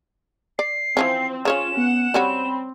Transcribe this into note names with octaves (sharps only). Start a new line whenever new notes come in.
D5 C7
E3 F3 C4 C#4
C#3 C#4 F4 C#5 F5 E7
B3 F#5
G3 C4 C#4 F#4 B5